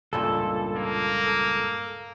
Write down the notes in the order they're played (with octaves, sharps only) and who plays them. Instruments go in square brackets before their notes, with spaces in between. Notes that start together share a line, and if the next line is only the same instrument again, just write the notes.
[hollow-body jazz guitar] C#2 G2 A#2 [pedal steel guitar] A4
[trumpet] A#3